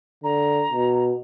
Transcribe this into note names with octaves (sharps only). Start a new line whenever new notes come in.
D3 A#5
B2